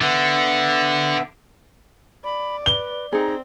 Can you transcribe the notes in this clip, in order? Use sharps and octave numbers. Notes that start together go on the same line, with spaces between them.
D3 B3 E5
D5 B5
B4 G7
C4 D#4 G#4 A#5